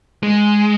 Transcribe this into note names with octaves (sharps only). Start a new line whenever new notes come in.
G#3